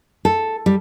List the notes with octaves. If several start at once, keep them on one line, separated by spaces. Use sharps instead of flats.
A4
G3